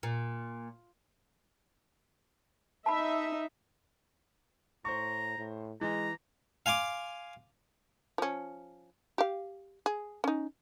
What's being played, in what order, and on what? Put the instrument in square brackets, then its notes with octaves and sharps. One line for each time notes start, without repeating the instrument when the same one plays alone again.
[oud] A#2
[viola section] D#4 E5 [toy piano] A5 B5
[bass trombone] A2 [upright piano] C5 C#6 [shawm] A#5
[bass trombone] A2
[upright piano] E3 [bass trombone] G#3 [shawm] A#5
[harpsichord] F5 G#5 C6 D6
[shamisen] F3 C#4
G4 F5
G#4
C#4 D#4